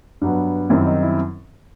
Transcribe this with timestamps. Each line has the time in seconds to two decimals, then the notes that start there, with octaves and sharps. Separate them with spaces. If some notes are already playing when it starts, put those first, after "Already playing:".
0.21 G2 F#3 B3
0.70 F#2 D#3 G3 C4 E4
0.87 D#4
1.02 E4